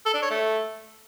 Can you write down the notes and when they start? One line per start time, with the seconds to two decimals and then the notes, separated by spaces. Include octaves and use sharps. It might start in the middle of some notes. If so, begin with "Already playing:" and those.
0.06 A4
0.14 D4
0.22 C#5
0.30 A3